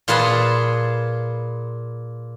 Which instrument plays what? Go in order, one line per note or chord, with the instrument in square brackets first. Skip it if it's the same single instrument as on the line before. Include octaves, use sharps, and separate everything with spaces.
[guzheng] A#2 F4 G#4 B4 A5 C6